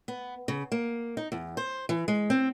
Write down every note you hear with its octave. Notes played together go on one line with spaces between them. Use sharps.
B3
C#3
A#3
D#4
E2
C5
E3
G#3
C4